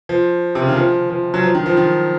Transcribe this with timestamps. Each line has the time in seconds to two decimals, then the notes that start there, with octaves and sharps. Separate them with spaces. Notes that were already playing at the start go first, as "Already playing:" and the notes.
0.09 F3
0.55 C3
0.62 C#3
0.69 D#3
0.77 F3
1.10 F3
1.34 F#3
1.43 F3
1.55 D#3
1.66 F3
1.77 D#3